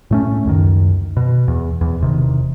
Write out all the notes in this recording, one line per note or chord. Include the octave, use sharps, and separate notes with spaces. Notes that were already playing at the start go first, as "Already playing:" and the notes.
A2 A3 C#4
C#2 F#2 D#3
B2
E2
E2
E1 C3 D#3